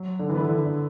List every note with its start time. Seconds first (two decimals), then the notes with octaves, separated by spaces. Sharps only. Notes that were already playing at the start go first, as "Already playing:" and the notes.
Already playing: F#3
0.19 D3
0.29 E3
0.34 D3 B3 E4 B4
0.48 D3
0.66 D3